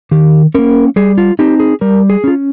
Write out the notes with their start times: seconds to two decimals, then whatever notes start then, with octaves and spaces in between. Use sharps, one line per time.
0.11 D#3 G4
0.54 A#3 C#4 A#4
0.96 G3 G#4
1.18 F4
1.39 C4 D#4 G4
1.60 G#4
1.81 G3 A#4
2.10 G#4
2.24 C#4 F4